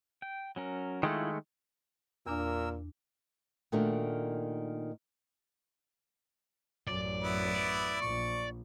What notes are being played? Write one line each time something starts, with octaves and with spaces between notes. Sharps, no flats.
G5
F#3 C#4 A#4
D#3 G#3 A3 E4 F4
E2 A#2 D4 A#4 E6
A#2 D#3 A3 D4 F#4
A1 F#2 D5
B3 E4
A#1 C#6